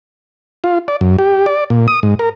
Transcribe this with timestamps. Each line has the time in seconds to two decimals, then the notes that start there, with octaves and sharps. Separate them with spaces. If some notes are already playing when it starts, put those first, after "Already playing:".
0.64 F4
0.88 D5
1.01 F#2
1.18 G4
1.46 D5
1.70 A#2
1.88 D#6
2.03 G#2
2.19 A#4